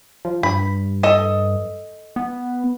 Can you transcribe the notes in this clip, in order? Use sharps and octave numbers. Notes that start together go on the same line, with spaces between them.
F3
G2 B5
A4 D#5
B3